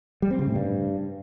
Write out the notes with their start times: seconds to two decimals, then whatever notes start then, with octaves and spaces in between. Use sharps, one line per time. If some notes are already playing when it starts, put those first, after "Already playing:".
0.22 G3
0.31 C4
0.39 C#3
0.47 A2
0.55 G2